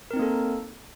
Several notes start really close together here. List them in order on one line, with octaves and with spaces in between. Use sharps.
A#4 C4 D#4 A#3 A4